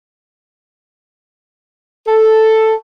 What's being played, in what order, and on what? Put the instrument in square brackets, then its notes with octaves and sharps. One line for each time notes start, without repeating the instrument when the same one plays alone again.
[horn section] A4